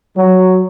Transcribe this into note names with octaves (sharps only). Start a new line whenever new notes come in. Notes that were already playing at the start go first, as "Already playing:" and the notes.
F#3